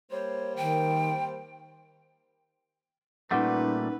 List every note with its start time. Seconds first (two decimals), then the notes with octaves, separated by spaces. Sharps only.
0.11 G3 A#3 C5 C#5
0.56 D#3 G5
3.31 A#2 G3 A3 C#4 D#4 B4 F#5